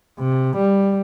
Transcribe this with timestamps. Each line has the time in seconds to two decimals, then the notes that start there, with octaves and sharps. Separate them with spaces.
0.20 C3
0.57 G3